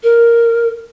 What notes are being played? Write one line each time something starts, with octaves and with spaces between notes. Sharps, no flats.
A#4